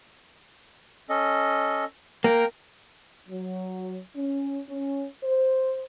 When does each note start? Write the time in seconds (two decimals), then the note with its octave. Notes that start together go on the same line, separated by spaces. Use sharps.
1.10 C#4 A4 D#5
2.24 A#3 A#4 G5 A#5
3.28 F#3
4.14 C#4
4.67 C#4
5.23 C5